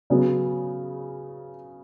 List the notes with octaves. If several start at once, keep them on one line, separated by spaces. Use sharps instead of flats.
C#3 F#3 B3